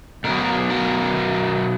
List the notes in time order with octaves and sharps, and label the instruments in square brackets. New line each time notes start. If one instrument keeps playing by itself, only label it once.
[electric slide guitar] B2 F#3 B3 A#4
A#4